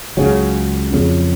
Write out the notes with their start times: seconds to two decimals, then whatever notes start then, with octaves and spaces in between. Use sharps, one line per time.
0.17 C#2 C#3 F#3
0.93 F2 C#3